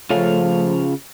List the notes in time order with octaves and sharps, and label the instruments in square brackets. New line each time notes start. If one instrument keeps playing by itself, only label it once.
[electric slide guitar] C#3 F4 F5 [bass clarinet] F3 [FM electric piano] A3 C#4